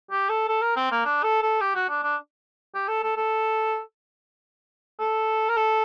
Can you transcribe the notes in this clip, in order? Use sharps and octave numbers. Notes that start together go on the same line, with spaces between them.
G4
A4
A4
A#4
C4
A#3
D4
A4
A4
G4
F#4
D4
D4
G4
A4
A4
A4
A4
A#4
A4